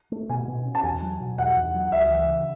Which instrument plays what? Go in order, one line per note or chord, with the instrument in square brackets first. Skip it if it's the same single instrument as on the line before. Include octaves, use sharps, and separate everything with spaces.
[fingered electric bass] A3
[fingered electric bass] B2 [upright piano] G#5
[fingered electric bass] B2
C#4
[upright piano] A5
[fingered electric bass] E2 [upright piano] G#5
[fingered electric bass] F#3
B2
[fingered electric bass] E2 [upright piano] F#5
[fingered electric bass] E2
F#3
[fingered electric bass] C#2 [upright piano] E5
[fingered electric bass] E3
C#3